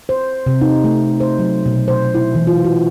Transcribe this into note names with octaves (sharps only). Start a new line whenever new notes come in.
C5
C3
D#4
A3
C5
F#3
B2
C5
E4
E3
F4
F#4